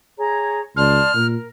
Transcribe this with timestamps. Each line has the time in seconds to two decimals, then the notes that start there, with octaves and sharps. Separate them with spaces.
0.18 G#4 C#5 A#5
0.77 C#2 D5 A5 C6 F6
1.14 A#2 A#4